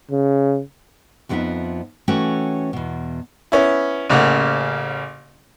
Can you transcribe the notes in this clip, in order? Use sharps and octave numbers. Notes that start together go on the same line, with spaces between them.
C#3
F2 F3 G#3 B3 D#4 E5
E3 A3 C#4 F#4 F#5 G5
E2 B2
B3 C#4 E4
A1 C#3 A#3 F#5